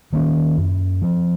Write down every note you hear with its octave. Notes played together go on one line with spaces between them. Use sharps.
D#3 A#3 C#4
F#2
F3 C4